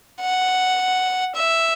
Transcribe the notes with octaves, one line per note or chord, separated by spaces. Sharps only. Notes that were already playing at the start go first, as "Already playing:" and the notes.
F#5
E5